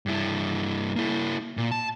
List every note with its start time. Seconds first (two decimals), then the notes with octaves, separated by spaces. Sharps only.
0.06 G2 E4
0.96 A#3 E4
1.57 A#2
1.71 A5